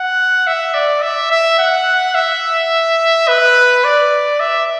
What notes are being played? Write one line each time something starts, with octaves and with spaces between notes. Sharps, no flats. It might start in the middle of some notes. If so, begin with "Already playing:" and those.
Already playing: F#5
E5
D5
E5
E5
F#5
E5
B4
D5
E5